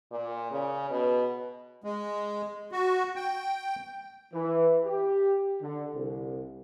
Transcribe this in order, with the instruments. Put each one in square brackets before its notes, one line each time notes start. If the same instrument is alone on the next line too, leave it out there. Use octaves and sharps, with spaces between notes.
[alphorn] A#2
C#3
B2
[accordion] G#3
F#4
G5
[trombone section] E3
G4
D3
C2